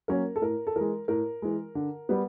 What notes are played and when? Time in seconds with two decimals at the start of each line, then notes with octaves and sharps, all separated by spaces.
0.08 F#3 A#3 C#4 A#4
0.36 A4
0.42 A2 A#4
0.67 A4
0.76 E3 G#3 A#4
1.08 A2 A#4
1.42 E3 G#3
1.75 D3
2.09 G3 B3